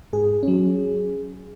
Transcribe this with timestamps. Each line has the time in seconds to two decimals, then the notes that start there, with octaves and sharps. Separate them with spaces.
0.13 G#2 G#4
0.43 F#3 C#4